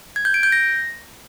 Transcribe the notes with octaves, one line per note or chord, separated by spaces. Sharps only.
G#6
G6
D7
G6
A#6